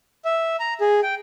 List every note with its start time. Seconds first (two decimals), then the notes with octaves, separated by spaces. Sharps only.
0.25 E5
0.60 A#5
0.81 G#4
1.03 G5